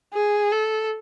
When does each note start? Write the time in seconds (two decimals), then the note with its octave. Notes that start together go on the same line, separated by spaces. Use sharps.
0.13 G#4
0.52 A4